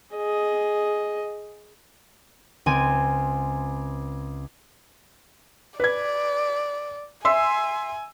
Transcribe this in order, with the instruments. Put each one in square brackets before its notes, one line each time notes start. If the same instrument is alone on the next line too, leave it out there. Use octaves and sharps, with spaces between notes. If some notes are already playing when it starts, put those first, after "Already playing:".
[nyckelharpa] G#4 D#5
[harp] C#2 C4 G#5 D#7
[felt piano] B4 G#6 [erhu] D5
[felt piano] E5 C6 E6 [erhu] G#5